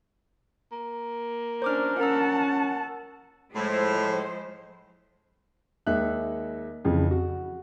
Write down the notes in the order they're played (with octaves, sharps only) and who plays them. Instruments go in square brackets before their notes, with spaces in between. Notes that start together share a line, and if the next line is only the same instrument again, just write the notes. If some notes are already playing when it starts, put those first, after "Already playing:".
[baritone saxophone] A#3
[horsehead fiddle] C#4 D4 [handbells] C5 D6 F6
[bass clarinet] C#4 [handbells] A#4 A#5 E6 [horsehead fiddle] F#5 A5
[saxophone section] A2 [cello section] F3 G#3 C5
[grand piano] D#2 G#3 D#4 E5 F#6
F2 C#3 E3
F#4